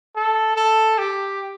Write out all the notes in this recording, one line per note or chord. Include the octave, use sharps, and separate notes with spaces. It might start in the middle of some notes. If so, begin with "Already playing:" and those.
A4
A4
G4